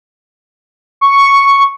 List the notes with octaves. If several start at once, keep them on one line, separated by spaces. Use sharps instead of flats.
C#6